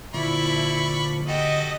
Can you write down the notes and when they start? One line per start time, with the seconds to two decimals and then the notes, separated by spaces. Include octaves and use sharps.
0.14 A#2 D3 F3 E4 D5 B5 C#6
1.28 F#4 G4 A4 D#5